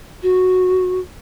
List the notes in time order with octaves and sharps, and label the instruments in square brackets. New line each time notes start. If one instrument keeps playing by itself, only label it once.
[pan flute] F#4